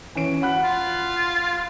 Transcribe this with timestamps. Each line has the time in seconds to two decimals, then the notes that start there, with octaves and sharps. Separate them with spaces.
0.15 E3 C#4 D7
0.42 F#5 B5 F#6
0.64 F4